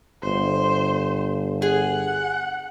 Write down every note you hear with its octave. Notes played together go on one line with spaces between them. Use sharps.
G1 C5
G#4 F#5